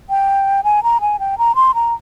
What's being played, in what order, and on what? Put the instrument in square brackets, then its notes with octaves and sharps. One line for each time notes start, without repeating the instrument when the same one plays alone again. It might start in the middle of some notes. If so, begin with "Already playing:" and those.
[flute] G5
G#5
A#5
G#5
G5
A#5
C6
A#5